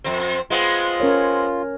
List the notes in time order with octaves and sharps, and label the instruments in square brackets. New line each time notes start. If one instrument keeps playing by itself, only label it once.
[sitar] F2 C4
[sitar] G#3 B3 C4 [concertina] F4
[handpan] C#4 A#4 C#5